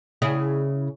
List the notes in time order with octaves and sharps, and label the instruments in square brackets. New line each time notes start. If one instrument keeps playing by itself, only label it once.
[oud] C#3 E4 G#4